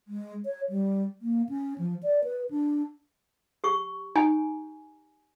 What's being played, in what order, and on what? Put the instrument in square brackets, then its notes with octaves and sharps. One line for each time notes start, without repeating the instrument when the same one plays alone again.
[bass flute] G#3
C#5
G3
A#3
C#4
F3
D5
B4
D4
[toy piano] G4 C#6
[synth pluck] D#4 [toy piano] G#5